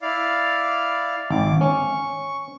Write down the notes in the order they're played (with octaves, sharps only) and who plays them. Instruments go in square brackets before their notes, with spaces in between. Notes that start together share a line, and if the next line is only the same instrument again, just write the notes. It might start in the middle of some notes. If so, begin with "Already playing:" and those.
[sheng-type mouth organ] E4 D5 F5
[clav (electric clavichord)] G#1 [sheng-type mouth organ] D6
[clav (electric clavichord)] C#4 [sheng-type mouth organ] C#6